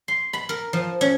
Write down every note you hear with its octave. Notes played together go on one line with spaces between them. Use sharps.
C6
B5
A#4
F3
C#4